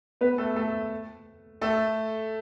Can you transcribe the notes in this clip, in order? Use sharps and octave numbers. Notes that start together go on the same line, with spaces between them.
B3 B4
A3 A4
A3 A4
A3 A4